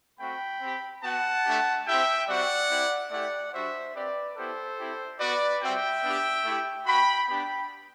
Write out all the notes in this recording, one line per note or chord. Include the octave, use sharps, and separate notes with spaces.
A3 C4 F#4 G5 B5
C4 G4
B3 F#4 F#5 A5
A3 D4 G4
C4 E4 G4 E5 G5
G3 C4 F#4 D5 F#5
C4 E4 G4
A3 E4 G4 D5 F#5
G3 D4 F#4 C5 E5
C4 G4 B4 D5
B3 E4 G4 A4 C5
C4 E4 G4
B3 F#4 B4 D5
G3 C4 F#4 E5 G5
B3 D4 G4
A3 E4 G4
B3 F#4 G5 B5
B3 D4 G4 G5 B5